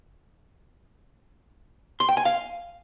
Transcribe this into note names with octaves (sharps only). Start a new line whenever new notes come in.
C6
G5
G#5
F5